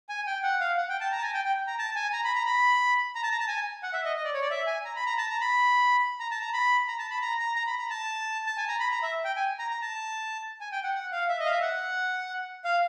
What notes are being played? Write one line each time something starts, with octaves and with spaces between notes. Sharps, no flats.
G#5
G5
F#5
F5
F#5
G5
A5
A#5
A5
G#5
G5
G5
A#5
A5
G#5
A#5
B5
A#5
B5
A#5
A5
A#5
A5
G#5
F#5
E5
D#5
D#5
D5
C#5
D5
E5
G#5
A#5
B5
A#5
A5
A#5
B5
A#5
A5
A#5
B5
A#5
A5
B5
A#5
A#5
A#5
B5
A#5
A5
A5
G#5
A#5
B5
A#5
E5
G5
G#5
A#5
A#5
A5
G#5
G5
F#5
F#5
F5
E5
D#5
F5
E5
F#5
F5